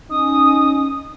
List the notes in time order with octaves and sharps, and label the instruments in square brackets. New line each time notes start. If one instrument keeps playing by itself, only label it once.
[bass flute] C#4 [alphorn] D#4 [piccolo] D#6